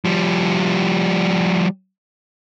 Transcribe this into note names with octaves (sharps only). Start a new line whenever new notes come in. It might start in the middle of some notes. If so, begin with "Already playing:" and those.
F3 G3